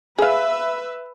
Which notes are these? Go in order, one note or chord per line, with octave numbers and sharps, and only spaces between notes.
G#4 B4 E5 F5